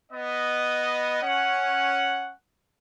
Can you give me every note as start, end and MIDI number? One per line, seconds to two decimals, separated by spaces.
0.12 1.20 59
0.12 1.20 75
1.22 2.32 61
1.22 2.32 78